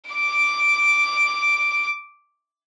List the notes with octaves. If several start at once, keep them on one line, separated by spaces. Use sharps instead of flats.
D6 D7